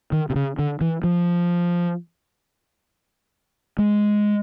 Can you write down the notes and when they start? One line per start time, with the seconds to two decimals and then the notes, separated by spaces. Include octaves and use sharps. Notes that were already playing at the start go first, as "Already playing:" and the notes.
0.12 D#3
0.30 C3
0.36 C#3
0.59 D3
0.81 E3
1.04 F3
3.79 G#3